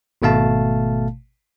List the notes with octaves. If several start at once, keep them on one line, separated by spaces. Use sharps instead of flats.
G#1 B2 A3 F5 A5